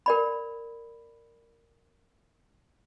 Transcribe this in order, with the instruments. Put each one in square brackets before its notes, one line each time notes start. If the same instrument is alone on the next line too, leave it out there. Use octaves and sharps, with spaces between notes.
[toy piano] A#4 D5 B5